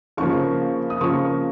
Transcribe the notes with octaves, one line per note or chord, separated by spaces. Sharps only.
C#3 F3 A#3 C#6
D#6
C#3 F3 A#3 C#6